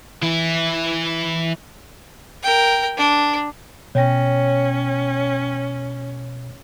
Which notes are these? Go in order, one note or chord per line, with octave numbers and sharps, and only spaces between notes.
E3 E4
A#4 G5
D4
B2 C#4 C#5 G5 A#6